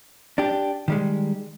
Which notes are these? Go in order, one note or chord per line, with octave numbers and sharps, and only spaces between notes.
D4 G4
D#3 G3 G#3